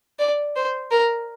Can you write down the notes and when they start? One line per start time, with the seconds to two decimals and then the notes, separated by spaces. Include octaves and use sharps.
0.19 D5
0.56 C5
0.91 A#4